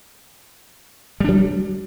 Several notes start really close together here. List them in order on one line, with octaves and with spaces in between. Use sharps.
G3 D4 F#3